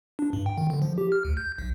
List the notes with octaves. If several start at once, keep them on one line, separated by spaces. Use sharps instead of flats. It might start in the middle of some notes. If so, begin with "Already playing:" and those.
D4
G2
G5
D#3
D3
F3
G4
F6
D2
G6
B1